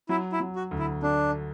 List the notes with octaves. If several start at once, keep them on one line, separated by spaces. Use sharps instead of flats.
F#3 E4
E4
F#3
F#4
D2
E4
D3 D4